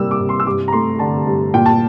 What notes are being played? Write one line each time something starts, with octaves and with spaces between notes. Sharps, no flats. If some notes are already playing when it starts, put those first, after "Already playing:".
Already playing: C3 G3 A#3 E6
D6
C3
C6
E6
G2 D6
A#5
A3 C6
D3 A5
G2
A#2 G5
A5